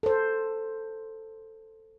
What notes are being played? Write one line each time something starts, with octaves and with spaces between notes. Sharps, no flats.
A4 C5